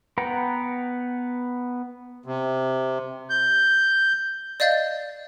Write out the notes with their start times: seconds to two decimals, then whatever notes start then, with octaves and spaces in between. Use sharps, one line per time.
0.18 B3 B4 F#5 G5 A#5
2.26 C3
3.30 G6
4.60 D5 D#5 F5 G6 A6